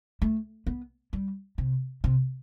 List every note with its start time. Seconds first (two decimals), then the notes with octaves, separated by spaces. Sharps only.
0.22 A3
0.67 B3
1.13 G3
1.58 C3
2.04 C3